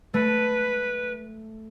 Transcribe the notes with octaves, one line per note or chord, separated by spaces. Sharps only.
A3 B4